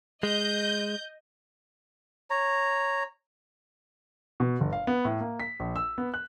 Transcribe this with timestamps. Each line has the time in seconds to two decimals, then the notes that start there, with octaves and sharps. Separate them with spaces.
0.23 G#3 D#5 G6
2.30 C#5 A#5
4.40 B2
4.60 G1
4.73 F5
4.87 B3
5.05 A2
5.20 A#3
5.40 B6
5.60 A#1
5.76 E6
5.98 B3
6.14 F#6